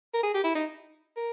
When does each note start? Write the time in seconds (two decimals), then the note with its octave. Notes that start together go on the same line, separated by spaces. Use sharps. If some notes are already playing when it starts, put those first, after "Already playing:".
0.14 A#4
0.23 G#4
0.35 G4
0.44 E4
0.55 D#4
1.17 A#4